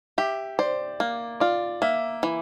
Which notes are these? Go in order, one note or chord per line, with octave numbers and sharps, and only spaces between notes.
G4 E5
C5 D5
A#3
F4 D5
A#3 E5
E3